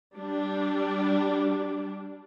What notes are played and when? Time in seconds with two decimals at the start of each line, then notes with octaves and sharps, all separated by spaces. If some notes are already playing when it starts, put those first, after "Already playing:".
0.16 G3 D4